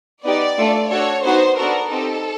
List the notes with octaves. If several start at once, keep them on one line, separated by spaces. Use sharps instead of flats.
B3 D#4 G4 D5
A3 D4 F4 A4
D4 F#4 A4 C#5
B3 D#4 F#4 C5
B3 D4 F#4 A4 A#4
C4 D#4 G4 A4